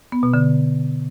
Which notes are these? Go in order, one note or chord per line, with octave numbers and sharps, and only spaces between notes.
B3
B2
D3